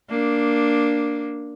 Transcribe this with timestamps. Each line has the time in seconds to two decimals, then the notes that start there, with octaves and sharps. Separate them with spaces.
0.10 A#3 D4